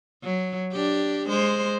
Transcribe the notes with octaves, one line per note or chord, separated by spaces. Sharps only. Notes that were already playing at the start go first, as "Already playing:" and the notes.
F#3
D4 G4
G#3 C5